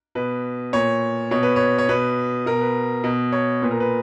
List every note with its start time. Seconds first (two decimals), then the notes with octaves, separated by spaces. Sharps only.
0.15 B2 B4
0.73 A#2 C#5
1.31 B2 C#5
1.43 B4
1.56 C#5
1.78 C#5
1.89 B2 B4
2.46 B2 A#4
2.61 B4
3.04 B2
3.32 C#5
3.62 A#2 B4
3.71 A#4
3.80 B4